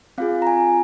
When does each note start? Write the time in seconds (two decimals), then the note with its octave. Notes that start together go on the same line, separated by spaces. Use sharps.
0.18 C4 F4 G#4 F5
0.42 A#5
0.47 G#5